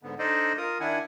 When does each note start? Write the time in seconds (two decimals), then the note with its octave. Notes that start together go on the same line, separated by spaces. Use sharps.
0.03 G#2 D3 B3
0.19 D4 D#4 A4 C5 D5 D#5
0.58 F4 A#4 D#6
0.80 D#3 D4 E4 F#5 G#5